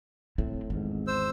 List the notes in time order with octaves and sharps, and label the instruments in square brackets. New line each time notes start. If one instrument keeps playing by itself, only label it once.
[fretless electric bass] A2 [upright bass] A3 C4
[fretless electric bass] G#1 E2 G#2 [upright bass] C4
[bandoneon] C5 E6